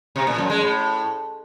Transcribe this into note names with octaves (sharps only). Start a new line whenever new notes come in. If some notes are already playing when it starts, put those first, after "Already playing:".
C3
A#2
F#2
G#3
A2